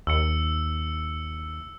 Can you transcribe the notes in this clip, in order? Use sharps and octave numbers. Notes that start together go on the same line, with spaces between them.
D#2 E6 C#7